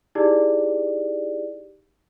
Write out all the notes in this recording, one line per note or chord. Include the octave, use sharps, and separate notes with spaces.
D#4 E4 G4 G#4 D5